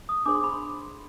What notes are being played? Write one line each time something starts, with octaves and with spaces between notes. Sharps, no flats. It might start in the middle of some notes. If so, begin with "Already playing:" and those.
D#6
D4 G#4 C5 D6
C6
B5
C6